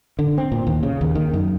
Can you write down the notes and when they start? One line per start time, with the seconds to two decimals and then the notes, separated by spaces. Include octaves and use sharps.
0.19 D3
0.38 C4
0.52 A#2
0.67 D#2
0.83 C#3
1.01 D#2
1.15 D#3
1.33 F#2